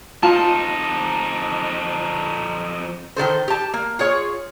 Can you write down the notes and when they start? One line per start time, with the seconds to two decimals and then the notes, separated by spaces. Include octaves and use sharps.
0.23 F2 D#4 F4 A5
3.16 D#3 F#3 A4 C5
3.48 G4 A5
3.74 A#3
3.99 F4 G#4 C#5